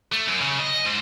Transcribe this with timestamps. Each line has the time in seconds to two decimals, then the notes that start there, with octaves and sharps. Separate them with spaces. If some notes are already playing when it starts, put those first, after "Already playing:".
0.12 A3
0.28 F#2
0.41 C#3
0.60 D#5
0.85 G#2